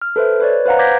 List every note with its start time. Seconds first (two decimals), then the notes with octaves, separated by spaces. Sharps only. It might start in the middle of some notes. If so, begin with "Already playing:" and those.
0.02 F6
0.16 A4 B4 C5 E5
0.40 B4 C#5 D5
0.66 B4 C5 F5 F#5 A#5
0.79 D6 G6 G#6 A#6 B6